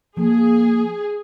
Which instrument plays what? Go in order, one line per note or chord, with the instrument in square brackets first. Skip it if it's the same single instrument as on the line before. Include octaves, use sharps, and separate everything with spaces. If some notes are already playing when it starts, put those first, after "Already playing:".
[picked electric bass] F3 [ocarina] A#3 [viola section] G#4